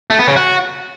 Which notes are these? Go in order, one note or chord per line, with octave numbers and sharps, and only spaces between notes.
A3
B3
C#3
F#4